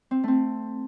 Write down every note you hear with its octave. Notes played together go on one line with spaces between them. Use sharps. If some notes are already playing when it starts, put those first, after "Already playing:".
C4
A3 C4